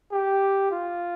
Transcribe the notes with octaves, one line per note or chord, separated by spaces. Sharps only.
G4
F4